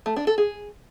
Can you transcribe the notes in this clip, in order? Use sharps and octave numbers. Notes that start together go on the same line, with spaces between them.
A3
D4
A4
G#4